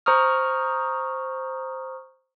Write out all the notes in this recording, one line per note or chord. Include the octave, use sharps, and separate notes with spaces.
C5 A#5 C#6 D#6 F6